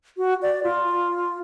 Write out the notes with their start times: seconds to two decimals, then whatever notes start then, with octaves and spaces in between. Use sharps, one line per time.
0.17 F#4
0.42 D5
0.63 F4